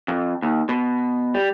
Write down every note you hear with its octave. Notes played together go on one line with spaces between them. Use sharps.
F2
D#2
B2
G3